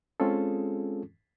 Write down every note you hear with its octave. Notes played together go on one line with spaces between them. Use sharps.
G#3 C4 C#4 F4 G#4 A4